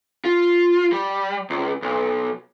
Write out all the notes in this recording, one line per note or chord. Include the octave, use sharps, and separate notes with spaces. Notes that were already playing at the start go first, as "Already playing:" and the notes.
F4
G3
C#2
B1